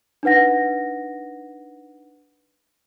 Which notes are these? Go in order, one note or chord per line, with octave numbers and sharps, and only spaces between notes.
D4 D#4 B4 F#5 A#6